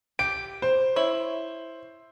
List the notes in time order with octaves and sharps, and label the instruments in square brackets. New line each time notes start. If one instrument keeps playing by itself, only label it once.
[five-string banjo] G4 [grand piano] D7
[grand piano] C5
[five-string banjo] E4 C#5